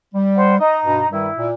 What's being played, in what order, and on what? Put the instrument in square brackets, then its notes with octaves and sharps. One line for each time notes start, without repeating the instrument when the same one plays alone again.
[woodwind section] G3
[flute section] C5 F#5 G5
[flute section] D#4 A#5 [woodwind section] D#5
[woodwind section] G2 B2
[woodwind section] G2 D#3 G3 [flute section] E4
[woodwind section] A#2